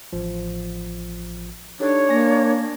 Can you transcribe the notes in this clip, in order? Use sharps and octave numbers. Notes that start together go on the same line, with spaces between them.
A1 F3
D4 D#4 G4 A4 C#5
A#3 G#5 A#6